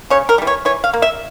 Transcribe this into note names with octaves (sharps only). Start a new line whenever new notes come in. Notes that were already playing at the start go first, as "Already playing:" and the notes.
C#3 C#5
A#4
E3 G3
C#5
E3 C#5
F5
A#3
E5